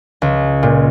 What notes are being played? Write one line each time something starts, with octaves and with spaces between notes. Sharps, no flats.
C#2
A#2